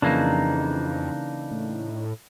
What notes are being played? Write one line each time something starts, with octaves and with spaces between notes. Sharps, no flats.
F2 C#3 E3 A#3 D4 D#4
A2